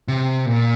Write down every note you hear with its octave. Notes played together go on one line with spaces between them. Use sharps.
C3
A#2